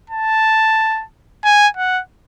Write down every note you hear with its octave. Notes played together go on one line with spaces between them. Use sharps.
A5
G#5
F#5